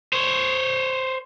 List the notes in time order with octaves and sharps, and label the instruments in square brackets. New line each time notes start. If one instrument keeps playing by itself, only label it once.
[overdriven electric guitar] C5 C#5